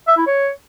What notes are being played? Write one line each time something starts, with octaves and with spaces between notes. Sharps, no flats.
E5
E4
C#5